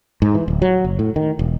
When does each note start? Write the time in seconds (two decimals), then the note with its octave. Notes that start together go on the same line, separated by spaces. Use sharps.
0.22 G#2
0.35 E3
0.48 D1
0.62 F#3
0.85 F#1
0.99 A2
1.16 D#3
1.39 E1